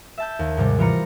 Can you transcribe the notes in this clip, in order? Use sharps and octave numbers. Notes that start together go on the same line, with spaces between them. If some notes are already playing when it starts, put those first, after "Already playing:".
E5 A5 G6
D#2
G#2 C3 G3
E3 G3 F4 A#5 C#7